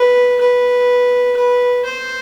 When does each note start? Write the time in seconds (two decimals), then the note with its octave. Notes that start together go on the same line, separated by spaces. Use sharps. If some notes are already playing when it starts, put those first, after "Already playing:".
Already playing: B4
0.41 B4
1.37 B4
1.85 C5